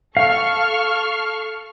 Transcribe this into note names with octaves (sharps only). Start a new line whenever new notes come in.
A4 F5 C#6 F6